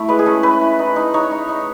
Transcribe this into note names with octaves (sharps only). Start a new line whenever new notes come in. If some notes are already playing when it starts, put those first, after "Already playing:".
Already playing: A3 E4
G#3 B4
G#4
C#4 A4
C#4 B4
E4
D#4
D#4
D#4 C#5
D#4
D#4